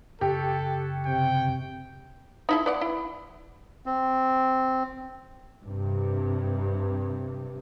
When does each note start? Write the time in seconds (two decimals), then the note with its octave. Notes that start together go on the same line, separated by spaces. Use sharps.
0.21 F#2 C#3 G4 A4
1.06 C3 G5
2.49 D#4 E4 A4
2.66 B3 D5 F#5
2.81 E4
3.86 C4
5.64 G2 C3